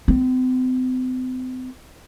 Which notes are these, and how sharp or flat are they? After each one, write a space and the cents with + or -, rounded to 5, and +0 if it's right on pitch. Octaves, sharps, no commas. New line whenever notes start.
C4 -40